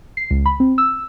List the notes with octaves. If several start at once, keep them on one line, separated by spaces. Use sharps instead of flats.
C7
C#2
B5
C4
E6